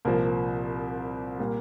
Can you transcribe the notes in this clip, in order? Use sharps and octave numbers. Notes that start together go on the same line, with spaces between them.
C2 A#2 F3 A#3
A#2 G3 A#3